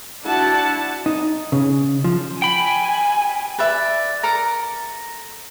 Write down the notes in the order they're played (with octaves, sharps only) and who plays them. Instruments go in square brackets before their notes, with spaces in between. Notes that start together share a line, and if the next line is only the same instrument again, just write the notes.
[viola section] D4 E4 F#4 F#5 A5
[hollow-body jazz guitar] D#4
C#3
F3
[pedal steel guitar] G5 B5 [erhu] G#5
[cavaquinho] B4 D5 E5
A4 A#4 A#5 D6